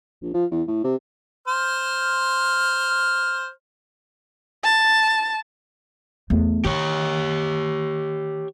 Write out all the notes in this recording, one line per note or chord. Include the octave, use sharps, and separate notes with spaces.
A#1
F3
E2
A2
C3
C5 F6
A5
E2 A3
D#3 G4 C#5